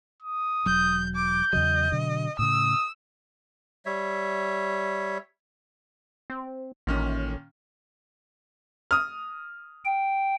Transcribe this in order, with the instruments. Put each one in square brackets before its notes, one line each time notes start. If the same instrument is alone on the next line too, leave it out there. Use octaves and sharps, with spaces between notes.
[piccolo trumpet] D#6
[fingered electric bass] E1 F#3 [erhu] G6
[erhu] D6 [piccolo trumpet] G6
[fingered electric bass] E2 C#3 F#3 [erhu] D#5
[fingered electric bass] B2 D3 F#3
[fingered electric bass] A2 C#3 [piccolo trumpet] D#6 [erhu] E6
[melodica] G3 C#5 E5
[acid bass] C4
[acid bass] A1 [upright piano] A#2 D#3 C#4
[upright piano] D#6 F6
[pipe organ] G5